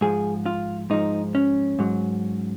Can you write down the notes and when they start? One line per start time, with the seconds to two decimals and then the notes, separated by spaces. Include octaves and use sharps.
0.01 G#2 F3 G#4
0.46 F4
0.90 G#2 F3 D#4
1.35 C#4
1.79 G#2 F#3